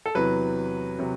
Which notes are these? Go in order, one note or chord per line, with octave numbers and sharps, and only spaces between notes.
A4
E2 C3 F#3 B4
C3 F#3